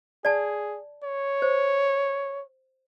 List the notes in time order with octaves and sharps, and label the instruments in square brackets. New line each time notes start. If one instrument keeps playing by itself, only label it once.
[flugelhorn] G#4 [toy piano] D5 A5
[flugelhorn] C#5
[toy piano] C5